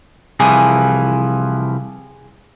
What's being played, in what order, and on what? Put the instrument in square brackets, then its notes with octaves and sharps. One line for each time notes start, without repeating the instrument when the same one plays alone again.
[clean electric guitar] C2 E3 F3 [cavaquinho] G#4